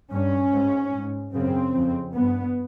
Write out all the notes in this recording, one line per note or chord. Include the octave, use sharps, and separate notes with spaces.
G2 C#4
G#2
G#2
F#2 C#3 C4
F2 C#3
G2 B3